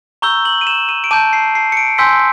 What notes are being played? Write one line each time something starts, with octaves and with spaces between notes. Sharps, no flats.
A#5 C#6 E6 G6 G7
F#7
D#7
E7
D#7
D7
A5 D6 G6 D#7
C7
C7
C#7
D7
G#5 C6 E6 G6 B6